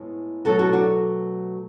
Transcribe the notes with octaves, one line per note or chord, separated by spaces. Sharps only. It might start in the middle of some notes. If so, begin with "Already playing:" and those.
Already playing: A2 G#3 B3
B2 F#3 A3 F#4 A4
F#4 A4
D4 F#4